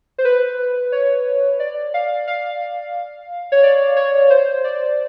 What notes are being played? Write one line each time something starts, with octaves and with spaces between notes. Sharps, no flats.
C5
B4
C#5
D5
F5
F5
C#5
D5
C#5
C5
D5